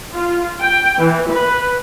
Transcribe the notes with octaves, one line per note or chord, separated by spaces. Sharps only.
F4
G5
E3
B4